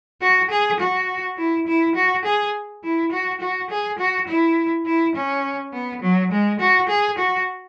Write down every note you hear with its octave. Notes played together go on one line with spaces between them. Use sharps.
F#4
G#4
F#4
E4
E4
F#4
G#4
E4
F#4
F#4
G#4
F#4
E4
E4
C#4
B3
F#3
G#3
F#4
G#4
F#4